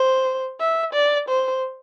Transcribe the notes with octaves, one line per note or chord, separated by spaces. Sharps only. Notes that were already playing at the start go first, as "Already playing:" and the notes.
Already playing: C5
E5
D5
C5